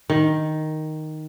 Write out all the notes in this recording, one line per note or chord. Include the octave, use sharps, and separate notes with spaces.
D#3